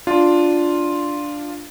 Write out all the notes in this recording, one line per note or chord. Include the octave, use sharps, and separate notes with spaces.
D4 F4